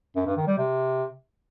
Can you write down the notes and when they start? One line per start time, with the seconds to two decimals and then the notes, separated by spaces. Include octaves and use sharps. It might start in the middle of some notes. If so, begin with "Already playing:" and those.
0.16 F#2
0.26 G2
0.37 D#3
0.47 G3
0.57 C3